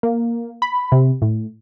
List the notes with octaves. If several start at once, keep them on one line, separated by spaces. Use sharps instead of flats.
A#3
B5
C3
A2